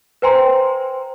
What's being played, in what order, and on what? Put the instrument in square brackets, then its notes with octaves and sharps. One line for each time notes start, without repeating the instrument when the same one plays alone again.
[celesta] B4 C5 G5 G#5 A#5 C6